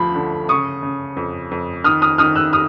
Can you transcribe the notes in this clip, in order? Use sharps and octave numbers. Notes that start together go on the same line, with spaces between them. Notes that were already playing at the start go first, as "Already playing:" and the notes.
Already playing: D2 F3 B5
D3
C#3 C#6 D#6
C#3
F2
F2
D#3 D#6 F6
D#6 F6
D#3 D#6 F6
E6 F#6
D#6 F6